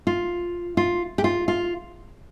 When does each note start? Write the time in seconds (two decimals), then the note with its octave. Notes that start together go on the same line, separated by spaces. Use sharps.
0.07 F4
0.77 F4
1.18 G4
1.24 F4
1.48 F4